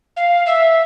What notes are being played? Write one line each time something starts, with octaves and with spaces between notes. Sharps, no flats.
F5
E5